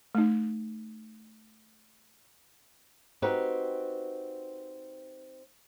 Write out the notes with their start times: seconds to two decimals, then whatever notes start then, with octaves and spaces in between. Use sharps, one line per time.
0.15 A3 D#4
3.22 C4 D#4 F#4 G4 B4